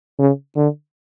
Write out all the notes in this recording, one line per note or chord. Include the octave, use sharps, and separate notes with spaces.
C#3
D3